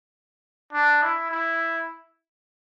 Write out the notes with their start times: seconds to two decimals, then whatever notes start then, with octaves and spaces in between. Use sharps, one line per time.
0.73 D4
1.03 E4
1.31 E4